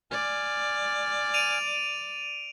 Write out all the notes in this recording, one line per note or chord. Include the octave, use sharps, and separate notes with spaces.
D5 G#5 F6
D7 D#7 F7